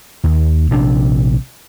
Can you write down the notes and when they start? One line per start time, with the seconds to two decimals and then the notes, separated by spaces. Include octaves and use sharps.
0.24 D#2
0.71 A#1 C3 D4